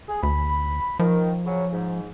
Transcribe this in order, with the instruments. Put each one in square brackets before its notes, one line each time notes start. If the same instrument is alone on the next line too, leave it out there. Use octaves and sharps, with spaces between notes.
[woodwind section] G#4
[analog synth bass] D2 [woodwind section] B5
[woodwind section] D#3 [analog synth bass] F3
[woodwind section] C#3 F#3
G#2